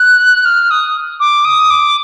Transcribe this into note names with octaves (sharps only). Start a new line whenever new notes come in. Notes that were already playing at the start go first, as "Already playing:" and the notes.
Already playing: F#6
F6
D#6
D6
D#6
D6